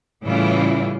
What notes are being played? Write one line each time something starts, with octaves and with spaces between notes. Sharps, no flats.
A2 C#3 E3 G3 E4 F4